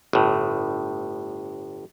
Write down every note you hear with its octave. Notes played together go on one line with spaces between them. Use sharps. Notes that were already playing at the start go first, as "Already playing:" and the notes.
G1 A2